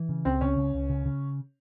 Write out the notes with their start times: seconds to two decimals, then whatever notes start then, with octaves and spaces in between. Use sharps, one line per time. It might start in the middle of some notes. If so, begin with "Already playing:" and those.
Already playing: E3
0.09 C#3
0.25 C#2 C4
0.41 C#3 C#4
0.57 C#2
0.74 C#2
0.90 C#3
1.06 C#3